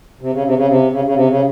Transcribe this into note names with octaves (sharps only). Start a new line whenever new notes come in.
C3
C#3
C3
C#3
C3
C#3
C#3
C3
C#3